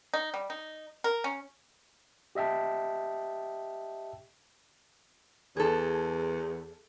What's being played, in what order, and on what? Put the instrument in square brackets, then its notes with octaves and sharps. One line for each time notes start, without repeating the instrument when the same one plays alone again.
[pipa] D#4
G3
D#4
A#4
C#4
[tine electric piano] G4 D#5 E5 G5 A5
[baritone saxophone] E2 [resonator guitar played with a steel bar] G#4 A4